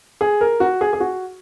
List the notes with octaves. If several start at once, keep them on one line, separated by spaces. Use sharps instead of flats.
G#4
A#4
F#4
G#4
G#4
F#4